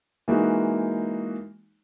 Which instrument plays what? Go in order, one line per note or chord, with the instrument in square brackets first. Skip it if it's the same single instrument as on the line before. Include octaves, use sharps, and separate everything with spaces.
[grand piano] E3 G#3 A#3 D#4 F#4